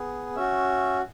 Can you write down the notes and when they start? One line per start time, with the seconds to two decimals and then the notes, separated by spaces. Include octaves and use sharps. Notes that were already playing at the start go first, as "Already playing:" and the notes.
Already playing: B3 G#4
0.36 C#4 F#4 E5